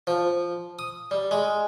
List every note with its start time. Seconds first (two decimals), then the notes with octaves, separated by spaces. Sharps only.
0.07 F3
0.79 D#6
1.11 G3
1.31 G#3